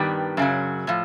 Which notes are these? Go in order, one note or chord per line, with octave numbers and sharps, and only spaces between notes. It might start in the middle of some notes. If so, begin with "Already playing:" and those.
Already playing: G2 D#3 G3 B3
F#2 C#3 F#3
A2 F3